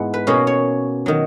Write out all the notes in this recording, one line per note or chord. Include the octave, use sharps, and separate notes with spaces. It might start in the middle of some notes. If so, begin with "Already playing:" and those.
Already playing: G#2 E3 G#3 B3 F#5
B4
B2 A#3 C#4 C#5
C#5
D#3 F#3